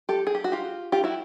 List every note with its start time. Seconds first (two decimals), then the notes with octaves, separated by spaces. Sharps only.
0.09 G4 A4
0.27 G#4
0.35 G4
0.44 F#4
0.52 F4 G4
0.92 F4 G4
1.04 E4 F#4